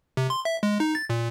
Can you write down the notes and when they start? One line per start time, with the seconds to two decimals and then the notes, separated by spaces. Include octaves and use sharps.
0.17 C3
0.30 C6
0.45 E5
0.63 G#3
0.80 D#4
0.95 A6
1.10 A#2